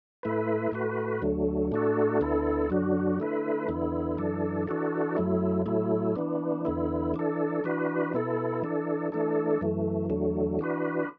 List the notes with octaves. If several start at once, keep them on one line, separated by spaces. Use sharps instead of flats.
A2 A3 E4 B4
A2 A3 F#4 B4
D2 D3 F#3 A3
A2 A3 D4 F#4 A4
D2 D3 B3 E4 A4
F#2 D3 F#3 D4 F#4
D3 A3 E4 B4
E2 D3 B3 E4
F#2 E3 D4 A4
E3 D4 F#4 A4
F#2 F#3 A3 E4
A2 F#3 A3 E4
E3 B3 D4
E2 D3 B3 E4
E3 D4 A4
E3 D4 F#4 B4
B2 B3 E4 A4
E3 D4 A4
E3 A3 D4 A4
F#2 E3 A3
E2 D3 F#3 A3
E3 D4 F#4 B4